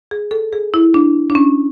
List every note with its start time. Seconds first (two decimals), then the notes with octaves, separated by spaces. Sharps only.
0.11 G#4
0.31 A4
0.53 G#4
0.74 E4
0.94 D4
1.30 D4
1.35 C#4